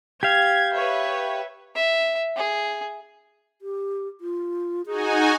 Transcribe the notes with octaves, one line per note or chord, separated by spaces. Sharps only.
G4 F5 G#6
B4 C#5 E5
E5
G#4
G4
F4
D#4 F#4 G#4 G#5